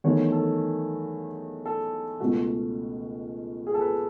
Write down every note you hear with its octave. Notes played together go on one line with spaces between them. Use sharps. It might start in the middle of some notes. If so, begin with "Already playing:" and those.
E2 D#3 F#3 A3 C#5
A4
A4
C#2 B2 A3 F#4
G#4
A4
B4